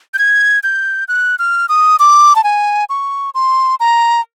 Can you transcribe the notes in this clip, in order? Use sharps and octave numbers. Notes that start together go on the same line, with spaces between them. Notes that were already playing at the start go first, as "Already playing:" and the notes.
G6
G#6
G6
F#6
F6
D#6
D6
A5
G#5
C#6
C6
A#5